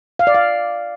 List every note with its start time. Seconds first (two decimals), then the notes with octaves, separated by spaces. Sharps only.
0.19 F5
0.27 D5
0.35 F5